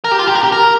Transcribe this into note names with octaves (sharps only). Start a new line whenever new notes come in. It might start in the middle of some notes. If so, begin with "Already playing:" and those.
A#4
G4
F4
G4
A#4
G4
A#4